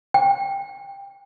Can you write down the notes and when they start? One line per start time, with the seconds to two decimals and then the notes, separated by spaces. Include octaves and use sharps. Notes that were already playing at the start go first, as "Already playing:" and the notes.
0.14 G5